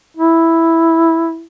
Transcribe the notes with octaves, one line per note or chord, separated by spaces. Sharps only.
E4